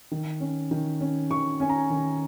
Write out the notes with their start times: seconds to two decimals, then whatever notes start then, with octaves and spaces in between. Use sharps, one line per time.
0.11 D#3
0.40 C#4
0.71 D#3
1.00 C#4
1.30 D#3 C#6
1.60 C#4 G#5
1.69 A#5
1.90 D#3